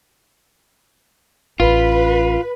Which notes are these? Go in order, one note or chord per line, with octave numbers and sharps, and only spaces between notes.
A1 C#4 F4 B4